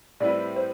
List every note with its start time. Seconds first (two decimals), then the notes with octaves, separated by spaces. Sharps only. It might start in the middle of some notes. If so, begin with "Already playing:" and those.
0.20 A2 G3 C4 E4 B4 D5
0.56 C5